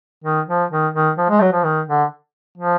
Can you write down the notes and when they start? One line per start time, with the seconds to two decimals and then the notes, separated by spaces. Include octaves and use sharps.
0.24 D#3
0.48 F3
0.71 D#3
0.94 D#3
1.18 F3
1.30 G#3
1.41 F#3
1.53 F3
1.64 D#3
1.88 D3
2.58 F3